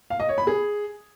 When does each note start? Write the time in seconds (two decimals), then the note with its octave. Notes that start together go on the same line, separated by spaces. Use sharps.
0.10 F5
0.20 D#5
0.29 C#5
0.38 B5
0.47 G#4